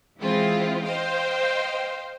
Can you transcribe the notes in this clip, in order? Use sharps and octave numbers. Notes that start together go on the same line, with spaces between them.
E3 G#3 C4 E4 F4
C5 D#5 F5 G5